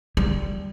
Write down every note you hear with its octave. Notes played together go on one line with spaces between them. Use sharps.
G3